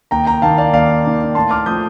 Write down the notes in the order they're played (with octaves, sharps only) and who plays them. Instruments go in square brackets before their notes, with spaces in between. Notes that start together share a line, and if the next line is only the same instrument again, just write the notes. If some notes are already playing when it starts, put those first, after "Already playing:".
[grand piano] D#2 G5 A#5
G5 A#5
D#3 A#3 F5 A5
D5 F5
D#2 D5 F5
D#3 A#3
A2 A5 C6
D6 F6
F3 A3 C4 D#6 G6